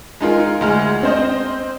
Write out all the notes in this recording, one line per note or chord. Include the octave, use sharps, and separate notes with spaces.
G#3 D#4 F4 A#4
D2 G#3 F6
C4 C5 D#5